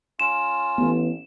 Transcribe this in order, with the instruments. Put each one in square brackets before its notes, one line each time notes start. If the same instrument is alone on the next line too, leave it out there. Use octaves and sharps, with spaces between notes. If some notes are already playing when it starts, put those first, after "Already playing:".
[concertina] C#4 F4 [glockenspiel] E7
[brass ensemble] A1 [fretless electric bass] B3